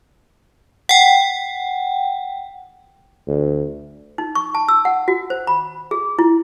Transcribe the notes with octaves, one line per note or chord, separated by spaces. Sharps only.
F#5 G5
D2
D#4
C#6
A5
E6
F#5
F#4
C5
B5
G#4
E4